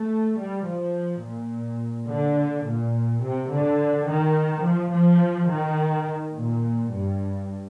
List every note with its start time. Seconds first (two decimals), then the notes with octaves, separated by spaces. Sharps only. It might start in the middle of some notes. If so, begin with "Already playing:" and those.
Already playing: A3
0.38 G3
0.66 F3
1.23 A#2
2.08 D3
2.66 A#2
3.23 C3
3.51 D3
4.08 D#3
4.64 F3
4.94 F3
5.50 D#3
6.35 A#2
6.93 G2